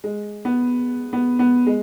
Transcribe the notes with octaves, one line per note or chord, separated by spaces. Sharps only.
G#3
B3
B3
B3
G#3